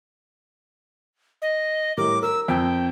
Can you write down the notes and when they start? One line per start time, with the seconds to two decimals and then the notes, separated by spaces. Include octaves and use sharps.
1.42 D#5
1.97 A2 G3 A#4 D6
2.22 A#4 E6
2.48 F2 G5